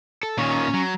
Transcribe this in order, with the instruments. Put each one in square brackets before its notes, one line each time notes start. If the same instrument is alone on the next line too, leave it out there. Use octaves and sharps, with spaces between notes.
[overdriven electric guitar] A4
[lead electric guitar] A#2 D#3 [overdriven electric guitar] C#4 C#5
[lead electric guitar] F#3